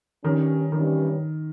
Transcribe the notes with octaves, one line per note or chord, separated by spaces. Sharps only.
G2 D#3 G3 C#4
G2 D#3 E3 G3 C#4